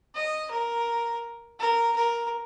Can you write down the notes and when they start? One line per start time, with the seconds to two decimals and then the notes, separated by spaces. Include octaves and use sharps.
0.15 D#5
0.51 A#4
1.60 A#4
1.96 A#4